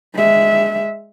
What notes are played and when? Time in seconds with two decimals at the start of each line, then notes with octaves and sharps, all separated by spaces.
0.14 G#3 E5